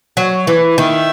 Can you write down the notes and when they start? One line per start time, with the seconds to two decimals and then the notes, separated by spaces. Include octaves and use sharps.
0.17 F#3
0.47 E3
0.78 D#3 E5